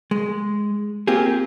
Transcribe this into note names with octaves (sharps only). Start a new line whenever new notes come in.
G#3
A#3 C4 F4 G4 G#4